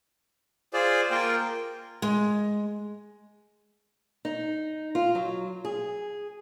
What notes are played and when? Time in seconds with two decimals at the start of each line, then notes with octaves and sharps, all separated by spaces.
0.74 F4 G#4 C5 D5
1.11 A#3 F4 A#4 G5
2.02 G#3
4.25 D#4
4.95 F4
5.15 F#3
5.65 G#4